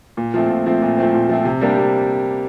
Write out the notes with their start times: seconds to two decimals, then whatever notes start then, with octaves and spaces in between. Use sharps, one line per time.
0.17 A#2
0.34 F3 A3 C4
0.50 A#2
0.66 F3 A3 C4
0.82 A#2
0.98 F3 A3 C4
1.14 A#2
1.29 F3 A3 C4
1.45 C3
1.61 G3 A#3 D4 G4
1.77 C3